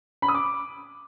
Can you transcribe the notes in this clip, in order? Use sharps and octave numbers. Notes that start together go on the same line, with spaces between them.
B5
D#6
D6